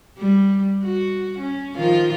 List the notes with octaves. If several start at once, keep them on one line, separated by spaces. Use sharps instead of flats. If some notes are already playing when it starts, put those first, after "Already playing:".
G3
F#4
C#4
D#3 F3 F4